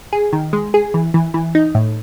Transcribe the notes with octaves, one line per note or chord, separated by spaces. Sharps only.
G#4
D#3
G#3
G#4
E3
E3
E3
D#4
A2